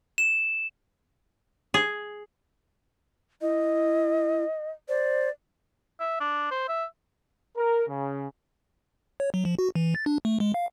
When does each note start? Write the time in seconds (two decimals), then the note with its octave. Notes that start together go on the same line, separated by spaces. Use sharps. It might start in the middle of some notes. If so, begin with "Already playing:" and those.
0.18 E7
1.74 G#4
3.41 E4 D#5
4.89 C5 D5
6.00 E5
6.20 D4
6.51 C5
6.68 E5
7.57 A#4
7.89 C#3
9.20 C#5
9.34 F#3
9.45 F3
9.59 F#4
9.75 E3
9.95 A6
10.06 D4
10.25 A3
10.40 G#3
10.54 F5